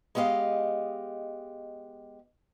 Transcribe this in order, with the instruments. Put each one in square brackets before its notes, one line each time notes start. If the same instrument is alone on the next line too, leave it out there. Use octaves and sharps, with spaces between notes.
[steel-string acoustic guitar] G#3 B3 G4 D#5 F5